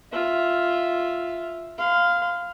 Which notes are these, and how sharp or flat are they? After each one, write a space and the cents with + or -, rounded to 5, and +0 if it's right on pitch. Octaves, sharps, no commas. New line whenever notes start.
F4 +0 E5 +0
F5 +0 C6 -40